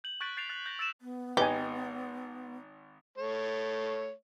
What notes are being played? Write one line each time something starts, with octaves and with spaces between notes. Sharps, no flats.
G6 F#7
C#6 F#6 G6 A6 B6 D7
C#6 G6 A6 C7 D7 F7
F#6 A6
G6 A#6
E6 A6 D7 E7
B3
G#1 D#4 G4 B4 D#5 G#5
A3 C#5